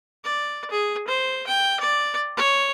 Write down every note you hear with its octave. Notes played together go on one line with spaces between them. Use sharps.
D5
G#4
C5
G5
D5
C#5